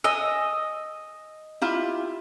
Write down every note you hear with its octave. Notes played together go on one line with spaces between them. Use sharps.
D#5 G#5 E6
E4 F4 G4